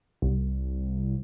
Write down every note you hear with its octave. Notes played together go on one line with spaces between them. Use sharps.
C2